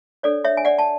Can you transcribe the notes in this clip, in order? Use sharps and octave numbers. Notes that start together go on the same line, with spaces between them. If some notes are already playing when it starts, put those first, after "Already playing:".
D4 A4 C#5 D5
C#5 E5
G#5
D5 F#5
A5